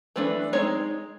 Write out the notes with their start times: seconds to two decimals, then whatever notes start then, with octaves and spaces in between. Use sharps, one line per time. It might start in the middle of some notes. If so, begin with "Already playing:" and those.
0.16 E3 A3 D4 B4
0.53 G#3 C4 D#4 C#5